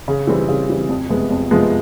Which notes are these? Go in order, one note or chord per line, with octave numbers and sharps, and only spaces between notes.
C#3
E3 G3 C4
C#3
E3 G3 C4
F2
C3 F3 G#3 B3
F2
C3 F3 G#3 B3